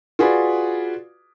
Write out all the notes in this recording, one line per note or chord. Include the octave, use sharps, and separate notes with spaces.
F4 F#4 G#4 B4 D5